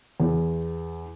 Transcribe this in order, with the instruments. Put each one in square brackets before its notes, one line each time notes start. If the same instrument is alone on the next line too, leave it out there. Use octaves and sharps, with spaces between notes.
[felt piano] E2